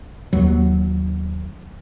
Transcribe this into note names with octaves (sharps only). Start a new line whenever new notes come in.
D#2 F#3